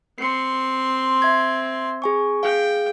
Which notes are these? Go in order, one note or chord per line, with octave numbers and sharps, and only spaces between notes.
C4 C6 C7 C#7
E5 G#6
G#4 G#5 C#6
G#4 F5 G5